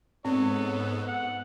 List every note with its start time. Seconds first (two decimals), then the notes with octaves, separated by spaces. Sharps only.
0.25 G#2 B3 C4 A4 C#5
1.08 F#5